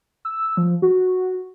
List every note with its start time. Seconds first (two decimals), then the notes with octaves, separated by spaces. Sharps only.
0.25 E6
0.57 F3
0.82 F#4